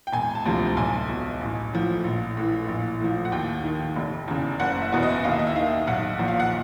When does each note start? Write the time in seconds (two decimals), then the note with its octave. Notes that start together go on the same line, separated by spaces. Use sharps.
0.07 G5
0.13 E1 G#5
0.35 A5
0.45 D2 C3 F3
0.77 B1 G#5
1.09 B2
1.41 A1
1.73 A2 F3
2.04 A#1
2.37 A2 E3
2.68 A#1
3.00 A2 F3
3.25 F#5
3.32 D#2 G5
3.64 D#3
3.96 F1
4.28 E2 C#3
4.60 F#1 F#5
4.82 E5
4.93 E2 B2
5.03 D#5
5.24 D#2 F5
5.32 E5
5.39 D#5
5.47 E5
5.56 D#3 F5
5.87 B1 F#5
6.19 A#2 F3
6.28 F5
6.40 F#5